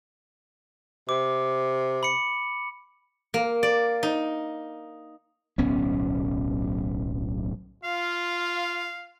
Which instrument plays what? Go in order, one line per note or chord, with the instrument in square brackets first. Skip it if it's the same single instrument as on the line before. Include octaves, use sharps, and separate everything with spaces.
[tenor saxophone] C3 [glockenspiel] D6
[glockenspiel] B5 C#7
[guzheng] A#3
D5
D#4
[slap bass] D1 B1 B3 C#4
[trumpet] F4 [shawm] F5